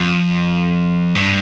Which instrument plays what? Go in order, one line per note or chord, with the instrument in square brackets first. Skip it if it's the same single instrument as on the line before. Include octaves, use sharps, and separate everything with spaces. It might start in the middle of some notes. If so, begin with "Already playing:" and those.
Already playing: [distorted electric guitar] F2
G2